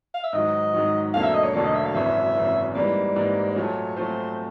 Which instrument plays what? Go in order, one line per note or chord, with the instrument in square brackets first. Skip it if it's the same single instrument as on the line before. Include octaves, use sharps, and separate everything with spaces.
[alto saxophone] F5
E5
[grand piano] G#2 D#3 F#3 [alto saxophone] D#5
[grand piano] G#2 D#3 F#3
[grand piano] E1 D2 D3 F#3 A#3 [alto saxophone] F5
[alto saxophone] E5
D#5
C#5
[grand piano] E1 D2 D3 F#3 A#3 [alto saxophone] D5
[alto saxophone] D#5
E5
F5
[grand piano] G#1 F#2 C#3 E3 [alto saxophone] E5
[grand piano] G#1 F#2 C#3 E3
[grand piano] G#2 E3 G3 A#3 [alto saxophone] D5
[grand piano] G#2 E3 G3 A#3
[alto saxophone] D5
[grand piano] A#2 F#3 A3 [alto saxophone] C#5
[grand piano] A#2 F#3 A3 [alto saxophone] C5